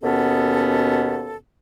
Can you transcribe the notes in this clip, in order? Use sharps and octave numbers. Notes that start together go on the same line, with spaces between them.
D#2 B2 B3 C#4 A4